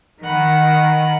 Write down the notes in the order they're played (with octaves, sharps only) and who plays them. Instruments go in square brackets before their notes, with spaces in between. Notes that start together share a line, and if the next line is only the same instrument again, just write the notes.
[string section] D#3 [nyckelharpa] F#5 B5